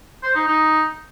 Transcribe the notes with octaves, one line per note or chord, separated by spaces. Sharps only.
C5
D#4
D#4